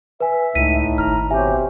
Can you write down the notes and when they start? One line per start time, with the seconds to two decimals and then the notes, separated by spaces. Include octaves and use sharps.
0.20 B4 E5 G#5
0.55 C#2 A2 D#4 B6 D#7
0.98 G#1 A#5 F6
1.30 B2 C4 G4 C#5 E5 G#5